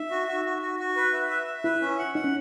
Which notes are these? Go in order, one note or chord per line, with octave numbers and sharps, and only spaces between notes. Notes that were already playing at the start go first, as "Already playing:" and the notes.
Already playing: D#4 E5
F#4
F#4
F#4
F#4
F#4
B4
E5
E5
E5
E4 B4
C#4
F#5
D#4 F#5
C#4